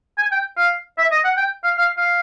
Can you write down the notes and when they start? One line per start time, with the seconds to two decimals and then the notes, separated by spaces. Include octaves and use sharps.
0.18 G#5
0.32 G5
0.58 F5
0.98 E5
1.11 D#5
1.24 F#5
1.37 G5
1.64 F5
1.78 F5
1.98 F5